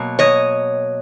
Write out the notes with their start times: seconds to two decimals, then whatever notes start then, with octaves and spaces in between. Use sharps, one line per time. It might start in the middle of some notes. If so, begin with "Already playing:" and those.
Already playing: B2 F#3 A#3
0.19 C#5 D#5